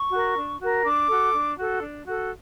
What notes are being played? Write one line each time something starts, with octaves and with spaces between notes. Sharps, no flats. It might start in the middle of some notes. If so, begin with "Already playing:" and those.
Already playing: C#6
F#4 A#4
D4
F#4 A#4
D4 D6
F#4 A4
D4
F#4 A4
D4
F#4 A4